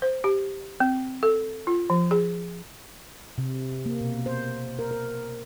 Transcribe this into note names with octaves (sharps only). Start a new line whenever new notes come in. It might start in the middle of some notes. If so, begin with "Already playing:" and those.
C5
G4
C4
A4
F4
F3
G#4
C3
A#3
B2
C5
A#4
A#4